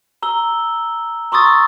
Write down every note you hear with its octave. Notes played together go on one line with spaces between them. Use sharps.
A#5 E6 G7
A#5 C6 C#6 D#6 E6 A6